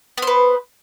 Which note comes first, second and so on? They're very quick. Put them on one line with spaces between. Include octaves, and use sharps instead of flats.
B3 C5 B4